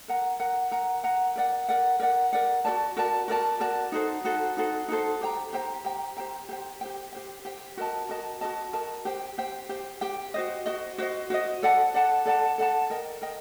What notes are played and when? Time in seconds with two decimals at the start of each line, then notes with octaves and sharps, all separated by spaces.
0.08 A#4 F#5 A#5
0.40 A#4 F#5 A#5
0.71 A#4 F#5 A#5
1.04 A#4 F#5 A#5
1.36 A#4 D5 F#5
1.69 A#4 D5 F#5
2.00 A#4 D5 F#5
2.33 A#4 D5 F#5
2.65 F#4 A#4 D5 A5
2.97 F#4 A#4 D5 A5
3.28 F#4 A#4 D5 A5
3.60 F#4 A#4 D5 A5
3.92 D#4 F#4 A4 C5
4.24 D#4 F#4 A4 C5
4.57 D#4 F#4 A4 C5
4.88 D#4 F#4 A4 C5
5.21 G4 C5 G5 A#5
5.53 G4 C5 G5 A#5
5.85 G4 C5 G5 A#5
6.17 G4 C5 G5 A#5
6.49 G4 C5 G5
6.81 G4 C5 G5
7.12 G4 C5 G5
7.45 G4 C5 G5
7.77 F#4 A#4 D#5 A5
8.09 F#4 A#4 D#5 A5
8.41 F#4 A#4 D#5 A5
8.73 F#4 A#4 D#5 A5
9.05 G4 C5 G5
9.38 G4 C5 G5
9.69 G4 C5 G5
10.01 G4 C5 G5
10.34 F#4 C5 D#5
10.66 F#4 C5 D#5
10.98 F#4 C5 D#5
11.30 F#4 C5 D#5
11.63 A4 D5 F#5 A5
11.94 A4 D5 F#5 A5
12.26 A4 D5 F#5 A5
12.58 A4 D5 F#5 A5
12.90 A#4 D#5 G5
13.22 A#4 D#5 G5